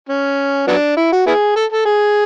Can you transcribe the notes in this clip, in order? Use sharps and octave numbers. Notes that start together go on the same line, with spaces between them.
C#4
F#3 B3 D4
E4
F#4
B3 E4 G#4
A4
A4
G#4